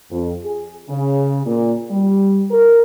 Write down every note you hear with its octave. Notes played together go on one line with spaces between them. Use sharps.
F2
G#4
C#3
A#2
G3
A#4